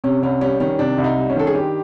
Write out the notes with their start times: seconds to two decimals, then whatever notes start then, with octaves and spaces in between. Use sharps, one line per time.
0.04 C3 C#4
0.23 C2 C#4
0.41 G3 C#4
0.60 D#3 C#4
0.79 C3 D4
0.98 C2
1.04 D#4
1.17 G3
1.30 C#4
1.36 D#3 A4
1.47 G#4
1.54 G2 G4